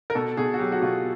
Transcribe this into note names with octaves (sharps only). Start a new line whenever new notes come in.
A#4
B2 A4
B2 G#4
F#4
F#3 G4
F#4
B2 F4